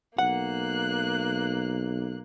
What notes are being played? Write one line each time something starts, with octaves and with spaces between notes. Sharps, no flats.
B1 A#3 F#5 F#6